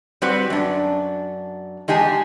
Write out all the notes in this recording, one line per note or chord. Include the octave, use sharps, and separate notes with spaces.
G3 C4 F#4 B4 F#5
F#2 D4
E2 G#3 G4 G#4 A5